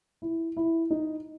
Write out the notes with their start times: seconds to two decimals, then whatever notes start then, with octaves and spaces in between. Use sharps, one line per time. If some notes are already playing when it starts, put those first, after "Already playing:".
0.22 E4
0.57 E4
0.90 D#4